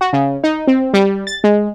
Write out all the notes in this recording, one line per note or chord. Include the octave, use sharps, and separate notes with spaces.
F#4
C#3
D#4
C4
G3
A6
G#3